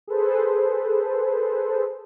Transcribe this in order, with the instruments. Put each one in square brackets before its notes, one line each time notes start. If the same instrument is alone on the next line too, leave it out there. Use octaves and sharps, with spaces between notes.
[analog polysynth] G#4 A4 B4 C5